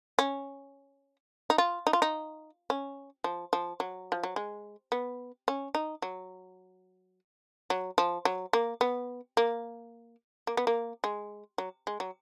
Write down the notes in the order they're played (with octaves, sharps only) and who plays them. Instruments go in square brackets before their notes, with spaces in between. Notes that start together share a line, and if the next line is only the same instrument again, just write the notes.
[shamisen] C#4
D#4
F4
D#4
F4
D#4
C#4
F3
F3
F#3
F3
F#3
G#3
B3
C#4
D#4
F#3
F#3
F3
F#3
A#3
B3
A#3
A#3
B3
A#3
G#3
F#3
G#3
F#3